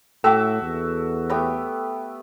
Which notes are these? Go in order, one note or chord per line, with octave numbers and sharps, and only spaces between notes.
A2 F#4 A4 E5 G5 D6 E6
E2
A3 B3 G4 C#5